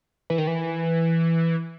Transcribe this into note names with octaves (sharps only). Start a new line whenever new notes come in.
E3
D#3
E3